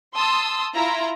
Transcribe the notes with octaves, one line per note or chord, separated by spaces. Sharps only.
A5 C6 D#6 E6
E4 F4 A#5